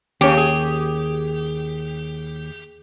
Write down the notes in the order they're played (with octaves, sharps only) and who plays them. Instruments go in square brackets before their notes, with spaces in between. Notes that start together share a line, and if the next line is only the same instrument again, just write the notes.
[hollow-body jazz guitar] D#2 C#5 [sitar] C#3 C#4 [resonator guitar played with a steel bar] G4
[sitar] G#4